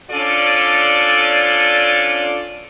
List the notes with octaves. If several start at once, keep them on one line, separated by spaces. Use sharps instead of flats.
C#4 D4 F4 A4 D5